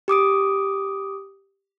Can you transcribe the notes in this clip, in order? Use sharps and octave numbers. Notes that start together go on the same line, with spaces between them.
G4 D6 D#6 D7